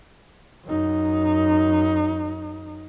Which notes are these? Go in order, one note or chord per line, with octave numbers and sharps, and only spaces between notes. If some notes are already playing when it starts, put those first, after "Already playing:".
F#2 D#4